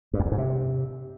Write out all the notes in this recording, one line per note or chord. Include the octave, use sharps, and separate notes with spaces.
G2
F2
E2
G#2
C3